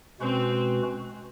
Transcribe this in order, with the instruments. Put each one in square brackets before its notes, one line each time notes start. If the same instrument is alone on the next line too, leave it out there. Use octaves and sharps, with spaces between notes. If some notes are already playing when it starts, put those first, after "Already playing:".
[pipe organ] B2 G#3 C#4 F#4 B4 [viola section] C4